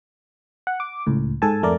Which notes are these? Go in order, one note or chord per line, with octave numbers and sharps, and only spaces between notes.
F#5
D6
C#2 A2
G#2 A4 G#5 A5
F2 A3 A#4 D5